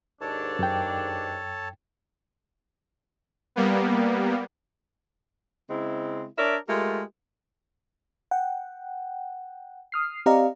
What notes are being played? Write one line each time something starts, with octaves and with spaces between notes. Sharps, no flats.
D#2 G#2 D4 A4 C#5 A5
F#2 G5
G3 A#3 B3
C#3 G#3 C4 E4
D4 A#4 C#5 D5 E5
G#3 A3 F4 G4 A#4
F#5 G5
D#6 F6 C7
C4 G4 D5 D#5 F5 A#5